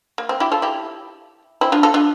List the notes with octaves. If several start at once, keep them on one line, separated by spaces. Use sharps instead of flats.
A#3
C4
E4 G4
F4 A4
E4 G4
C4 E4
D4 F4
F4 A4
D4 F4